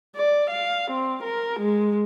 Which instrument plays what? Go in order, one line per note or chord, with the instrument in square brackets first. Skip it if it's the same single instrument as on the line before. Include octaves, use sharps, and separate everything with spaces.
[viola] D5
F5
C4
A#4
G#3